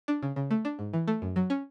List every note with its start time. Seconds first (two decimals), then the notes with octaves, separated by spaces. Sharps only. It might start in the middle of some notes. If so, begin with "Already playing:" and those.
0.08 D4
0.23 C#3
0.36 C#3
0.51 A3
0.65 D4
0.79 G#2
0.93 E3
1.08 A3
1.22 F#2
1.36 F#3
1.50 C#4